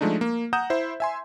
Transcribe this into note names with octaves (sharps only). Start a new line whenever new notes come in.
F3 G#3 A3 D4 D#4
A#3
F#5 A#5 D#6 G6 E7
E4 C5 E5
E5 G#5 C6